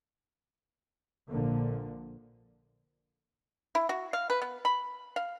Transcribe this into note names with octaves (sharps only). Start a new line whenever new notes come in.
A#1 A#2 D3 F3 A#3
E4
F#4
F5
B4
B3
B5
F5